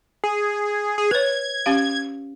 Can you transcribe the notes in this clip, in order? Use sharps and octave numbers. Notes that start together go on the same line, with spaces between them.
G#4
G#4
B4 C#5 G#6
C#4 G4 F5